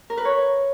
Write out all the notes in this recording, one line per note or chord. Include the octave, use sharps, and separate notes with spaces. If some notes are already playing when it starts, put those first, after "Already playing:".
A#4
B4
C#5